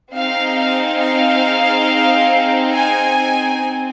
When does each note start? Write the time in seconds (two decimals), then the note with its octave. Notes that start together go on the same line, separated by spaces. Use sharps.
0.14 C4 D#4 G#4 F5
0.58 F5
1.01 F5
2.74 G#5
3.62 C4